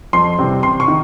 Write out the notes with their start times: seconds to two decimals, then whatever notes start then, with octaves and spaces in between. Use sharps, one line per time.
0.13 F2 C6
0.38 C3 E3 G3 C4
0.63 C3 C6
0.80 C#6
0.88 D#3